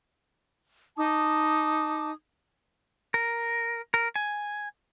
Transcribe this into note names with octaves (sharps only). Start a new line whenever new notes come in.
D#4 A5 D6 D#6
A#4
A#4
G#5